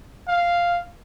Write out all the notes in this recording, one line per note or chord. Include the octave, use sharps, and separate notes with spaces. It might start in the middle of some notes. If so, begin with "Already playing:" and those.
F5